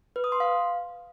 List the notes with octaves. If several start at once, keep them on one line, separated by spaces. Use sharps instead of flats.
B4
D#6
C6
F5